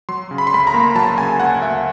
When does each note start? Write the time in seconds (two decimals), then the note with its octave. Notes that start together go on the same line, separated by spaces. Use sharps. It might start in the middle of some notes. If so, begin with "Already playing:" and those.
0.09 F#3 C6
0.31 C#3
0.38 B5
0.47 C6
0.53 D2 B5
0.67 A#5
0.74 A#3
0.95 F#3 A5
1.18 C#3 G#5
1.40 D2 F#5
1.61 A#3 E5